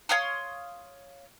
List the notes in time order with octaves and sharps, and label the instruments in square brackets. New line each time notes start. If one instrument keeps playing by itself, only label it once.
[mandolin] C#5 F5 C6 D#6